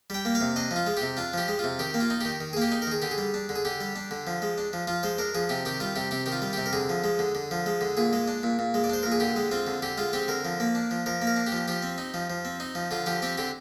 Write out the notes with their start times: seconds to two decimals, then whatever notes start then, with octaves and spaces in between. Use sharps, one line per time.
0.10 G3 G5
0.25 A#3
0.35 F5
0.41 C3
0.56 D4 D#5
0.71 F3
0.76 F4
0.86 G#3
0.97 C3 G4
1.17 D4 F4
1.33 F3 G4
1.48 G#3
1.59 C3 F4
1.79 D#3 G4
1.94 A#3
2.00 F4
2.10 D#4
2.21 D#3 G4
2.40 D#3
2.53 G#4
2.57 A#3 G4
2.72 D#4
2.82 A#4
2.87 D#3 G#4
3.02 D3 G4
3.11 G#4
3.18 G3
3.34 D4
3.49 D3
3.56 G#4
3.65 D3 G4
3.81 G3
3.96 D4
4.11 D3
4.27 F3
4.42 G#3
4.58 D4
4.73 F3
4.87 F3 F4
5.03 G#3 C5
5.18 D4 A#4
5.35 F3 G#4
5.49 C3 G4
5.65 D#3 G4
5.80 G3 F4
5.96 C3 G4
6.11 C3 G4
6.26 D#3 G4
6.32 F4
6.42 G3
6.53 C3 G4
6.66 A#4
6.73 D3 G#4
6.89 F3
7.04 G#3
7.19 D3
7.35 D3
7.51 F3
7.66 G#3
7.81 D3
7.97 A#2 G#4
8.13 G#3
8.28 D4
8.43 A#2
8.59 A#2
8.74 G#3
8.84 D5
8.90 D4 C5
9.03 A#2 A#4
9.12 G#4
9.20 D3 G4
9.36 G#3
9.51 C4 F4
9.67 D3
9.82 D3 G4
9.98 G#3 F4
10.13 C4 G4
10.28 D3 A#4
10.45 F3
10.60 A#3
10.75 D4
10.91 F3
11.06 F3 A#4
11.22 A#3
11.27 A#4
11.36 D4
11.46 G4
11.52 F3
11.68 F3 G4
11.82 C4
11.98 D#4
12.14 F3
12.30 F3
12.45 C4
12.60 D#4
12.75 F3
12.91 D3 F4
13.06 F3 G4
13.22 C4 G4
13.38 D3 G4